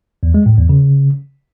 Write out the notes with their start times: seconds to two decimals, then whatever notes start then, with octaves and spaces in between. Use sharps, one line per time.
0.23 E2
0.34 G#3
0.46 A2
0.58 E2
0.69 C#3